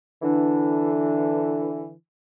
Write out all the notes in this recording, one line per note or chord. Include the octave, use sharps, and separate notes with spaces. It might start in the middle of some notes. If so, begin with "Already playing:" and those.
D3 E3 D4